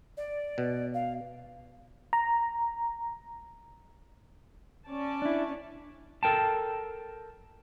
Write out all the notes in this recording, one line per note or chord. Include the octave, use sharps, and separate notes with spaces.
D5
B2
F5
A#5
C#4 D5 A5
D4 E4
A4 A#4 G5 A5